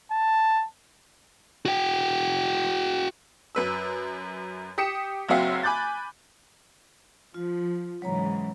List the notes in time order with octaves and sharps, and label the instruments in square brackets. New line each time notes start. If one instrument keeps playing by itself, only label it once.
[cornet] A5
[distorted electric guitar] F#4 G5
[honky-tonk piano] F#2 B4 E6
G4 D#6 B6 C#7 E7
F#1 F#3 C4 F#4 E5 F5
G#5 B5 D6 F#6 G6 A6
[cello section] F3 [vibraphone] F4
[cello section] G#2 C#3 E3 [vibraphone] F#3 C#5 A#5